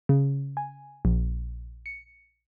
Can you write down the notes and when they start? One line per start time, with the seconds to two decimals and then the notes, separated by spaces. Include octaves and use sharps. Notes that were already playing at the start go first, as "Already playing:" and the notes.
0.09 C#3
0.57 G#5
1.05 A#1
1.86 C#7